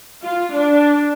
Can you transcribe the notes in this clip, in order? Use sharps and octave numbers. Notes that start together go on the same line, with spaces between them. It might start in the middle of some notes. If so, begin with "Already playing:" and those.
F4
D4